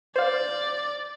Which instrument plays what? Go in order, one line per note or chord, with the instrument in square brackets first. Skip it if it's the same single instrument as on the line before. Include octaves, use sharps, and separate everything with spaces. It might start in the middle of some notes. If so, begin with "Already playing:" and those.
[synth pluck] C5 F5 [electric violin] D5